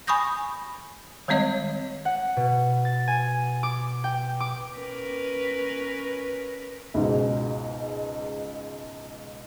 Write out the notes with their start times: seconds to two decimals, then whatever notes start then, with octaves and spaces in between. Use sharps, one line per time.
0.07 G#5 B5 C#6 D#6 G6 A#6
1.28 D#3 G3 G#3 C4 C#5 D#5
2.05 F#5
2.37 B2
2.85 A6
3.08 G#5
3.63 D6
4.04 G5
4.40 D6
4.77 C#4 A#4 B4
6.94 C#2 G#2 B2